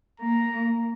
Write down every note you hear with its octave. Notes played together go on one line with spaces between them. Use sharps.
A#3 A#5